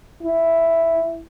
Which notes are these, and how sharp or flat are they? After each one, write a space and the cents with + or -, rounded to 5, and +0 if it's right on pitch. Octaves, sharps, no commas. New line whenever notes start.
E4 +5